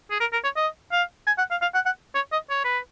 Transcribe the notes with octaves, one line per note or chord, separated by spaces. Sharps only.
G#4
A#4
A#4
C#5
D#5
F5
G#5
F#5
F5
F5
F#5
F#5
C#5
D#5
C#5
B4